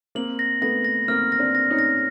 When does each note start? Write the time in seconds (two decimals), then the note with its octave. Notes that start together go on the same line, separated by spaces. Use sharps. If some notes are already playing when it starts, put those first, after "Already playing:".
0.15 A#3 C4 F#7
0.39 A#6
0.62 A3 B3 A#6
0.85 A#6
1.08 A#3 C4 F6
1.32 A#6
1.39 C4 D4
1.55 A#6
1.70 C#4 D#4
1.79 A#6